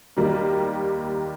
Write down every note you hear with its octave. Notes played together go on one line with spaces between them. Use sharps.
D#2 D#3 G3 A#3